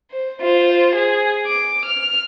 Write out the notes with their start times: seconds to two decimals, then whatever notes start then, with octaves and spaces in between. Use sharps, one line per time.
0.11 C5
0.41 F4 C5
0.96 G#4
1.47 D6
1.85 F6